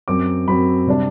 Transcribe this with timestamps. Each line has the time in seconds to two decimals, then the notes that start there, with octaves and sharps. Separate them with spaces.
0.08 F#2 F#3 C4 D6
0.48 F#2 F#3 C4 B5
0.87 C3 G3 D4